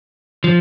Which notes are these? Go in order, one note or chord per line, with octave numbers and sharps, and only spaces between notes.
F3